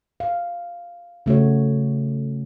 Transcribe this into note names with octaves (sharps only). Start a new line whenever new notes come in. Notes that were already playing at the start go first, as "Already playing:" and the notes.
F5
C#3 A3 F#4 C#5